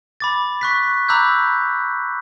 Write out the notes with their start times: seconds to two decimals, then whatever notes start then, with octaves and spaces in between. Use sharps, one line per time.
0.20 B5 D6 A6
0.61 C#6 F#6 B6
1.08 A#5 B5 D6 E6 F#6 G6